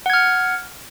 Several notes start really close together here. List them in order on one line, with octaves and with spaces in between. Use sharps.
F#5 G#6 F6